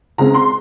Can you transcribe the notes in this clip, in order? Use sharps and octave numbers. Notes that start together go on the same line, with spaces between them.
C#2 C#3 G#3 C4 A#5
C6